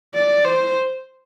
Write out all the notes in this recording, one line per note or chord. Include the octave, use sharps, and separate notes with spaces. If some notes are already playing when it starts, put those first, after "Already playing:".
D5
C5